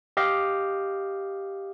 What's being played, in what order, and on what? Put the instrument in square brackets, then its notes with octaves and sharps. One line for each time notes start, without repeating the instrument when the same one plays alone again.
[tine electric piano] G4 D#5 F5